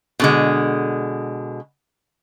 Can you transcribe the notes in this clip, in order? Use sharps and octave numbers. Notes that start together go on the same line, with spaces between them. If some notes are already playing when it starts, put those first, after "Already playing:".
B2 D3 G#3